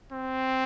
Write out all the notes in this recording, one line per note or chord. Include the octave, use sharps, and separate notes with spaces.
C4